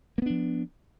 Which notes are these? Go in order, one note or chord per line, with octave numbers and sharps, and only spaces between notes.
F3 A#3 B3 D4